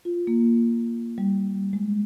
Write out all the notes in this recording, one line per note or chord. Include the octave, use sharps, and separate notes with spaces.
F4
A#3
G3
G3
G#3